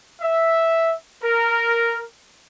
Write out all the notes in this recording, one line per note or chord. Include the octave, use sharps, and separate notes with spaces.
E5
A#4